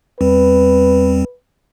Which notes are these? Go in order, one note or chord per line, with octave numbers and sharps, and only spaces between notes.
E2 G3 C4 B4